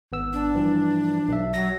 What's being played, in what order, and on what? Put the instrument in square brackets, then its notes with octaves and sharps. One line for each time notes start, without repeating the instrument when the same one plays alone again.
[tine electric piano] G#1 B3 E6
[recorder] D4
[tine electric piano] G2 E3 F3
B1 E5
[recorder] F#3 [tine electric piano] A#6